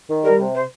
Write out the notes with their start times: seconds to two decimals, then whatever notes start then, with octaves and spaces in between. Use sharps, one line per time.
0.09 D#3
0.24 G3 A#4
0.39 C3
0.55 C5